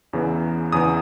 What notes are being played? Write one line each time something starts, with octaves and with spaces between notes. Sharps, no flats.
E2 C#3 E3 B3
E2 C#3 E3 B3 D#6